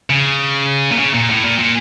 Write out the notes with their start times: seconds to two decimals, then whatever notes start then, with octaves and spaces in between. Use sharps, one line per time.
0.10 C#3
0.92 A#2
0.99 C#3
1.14 A#2
1.30 A2
1.44 A#2
1.59 A#2